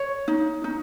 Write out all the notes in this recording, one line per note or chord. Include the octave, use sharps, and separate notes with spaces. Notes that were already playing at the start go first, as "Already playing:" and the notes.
Already playing: C#5
D#4
D#4